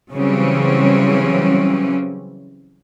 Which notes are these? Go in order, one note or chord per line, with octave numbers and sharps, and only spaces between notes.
C#3 E3 F#3 G3 C4 C#4